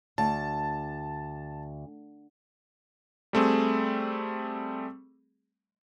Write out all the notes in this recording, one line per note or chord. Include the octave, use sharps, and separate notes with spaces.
D2 A5
G3 A3 C4 G#4